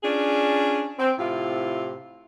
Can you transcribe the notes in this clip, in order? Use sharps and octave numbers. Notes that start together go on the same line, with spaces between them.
C#4 D4 F4 G#4
C4
A2 C3 E4 F4